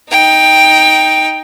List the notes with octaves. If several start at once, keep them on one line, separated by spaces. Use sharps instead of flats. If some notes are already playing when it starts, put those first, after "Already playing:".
D#4 G5